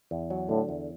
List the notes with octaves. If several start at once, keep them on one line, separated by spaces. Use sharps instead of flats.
E2
F#3
A2 D3
E2